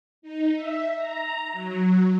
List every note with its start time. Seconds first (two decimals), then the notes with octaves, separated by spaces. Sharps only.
0.22 D#4
0.55 E5
0.95 A#5
1.52 F#3